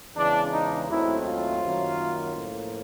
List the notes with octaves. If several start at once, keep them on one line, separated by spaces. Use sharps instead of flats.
E2 C#3 E3 G#3 D4
D#4
D#2 D#3 F#3 A3 C4 E4
F4
F#2 D#3 F#3 A#3
A2 F3 A#3